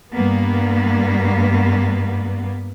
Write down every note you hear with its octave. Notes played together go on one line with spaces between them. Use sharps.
G2 A#3 B3